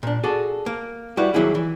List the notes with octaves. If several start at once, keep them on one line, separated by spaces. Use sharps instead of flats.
A#2 D4
F#4 G#4 A4 D5
A#3
G3 E4 F#4 B4
D#2 G#2 F#3 A#3 E4 G#4
E3